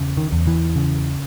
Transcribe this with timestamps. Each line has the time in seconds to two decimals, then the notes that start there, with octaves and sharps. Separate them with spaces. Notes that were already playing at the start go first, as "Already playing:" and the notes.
Already playing: E2 C#3
0.17 D#3
0.32 E2
0.47 E3
0.76 C#3